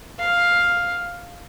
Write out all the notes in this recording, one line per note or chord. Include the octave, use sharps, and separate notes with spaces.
F5